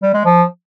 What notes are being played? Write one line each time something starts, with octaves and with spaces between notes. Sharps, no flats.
G3
G#3
F3